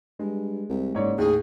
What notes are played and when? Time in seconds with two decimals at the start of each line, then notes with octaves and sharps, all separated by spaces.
0.19 G2 G#3
0.69 C2
0.95 F#1 G#2 C#5 D5
1.18 D#2 A2 G#4